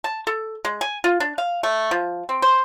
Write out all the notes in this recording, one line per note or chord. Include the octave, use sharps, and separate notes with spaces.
A5
A4
G#3
G#5
F4
D4
F5
A3
F3
C4
C5